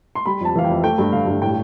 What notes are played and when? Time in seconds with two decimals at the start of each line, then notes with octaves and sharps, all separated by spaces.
0.15 C6
0.26 G3 B5
0.41 F2 A5
0.55 E3 F5
0.65 F2 G5
0.83 A3 G5
0.98 G2
1.13 D3 F5
1.27 G2
1.42 A2 G5